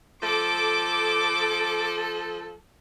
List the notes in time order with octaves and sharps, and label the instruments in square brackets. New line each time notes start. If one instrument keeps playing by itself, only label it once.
[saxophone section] F3 A4 [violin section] D6